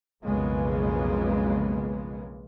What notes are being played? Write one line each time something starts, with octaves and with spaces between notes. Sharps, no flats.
B1 F2 C#3 G#3 A#3 B3